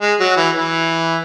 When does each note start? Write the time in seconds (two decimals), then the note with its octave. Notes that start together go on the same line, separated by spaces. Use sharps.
0.02 G#3
0.20 F#3
0.37 E3
0.55 E3